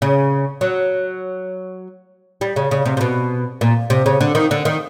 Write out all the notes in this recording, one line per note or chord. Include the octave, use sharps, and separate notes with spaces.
C#3
F#3
G3
C#3
C#3
C3
C3
B2
A#2
C3
C#3
D3
D#3
D3
D#3